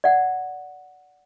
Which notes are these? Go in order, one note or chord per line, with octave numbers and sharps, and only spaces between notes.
D5 F#5